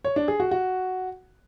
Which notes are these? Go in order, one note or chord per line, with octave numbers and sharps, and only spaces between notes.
C#5
D4
G#4
F#4
F#4